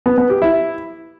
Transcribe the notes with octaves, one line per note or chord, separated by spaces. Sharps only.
B3
B3
G4
E4